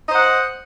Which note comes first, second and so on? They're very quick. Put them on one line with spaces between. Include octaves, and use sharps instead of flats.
D#5 C5 F#5